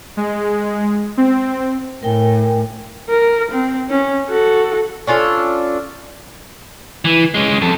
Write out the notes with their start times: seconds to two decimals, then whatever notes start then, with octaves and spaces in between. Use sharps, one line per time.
0.17 G#3
1.17 C4
2.03 A2 A#4 G5 G#5
3.09 A#4
3.51 C4
3.89 C#4
4.29 F#4 A4
5.07 C#4 D4 F4 A4
7.05 E3
7.34 G#3 C#4
7.62 F2 A4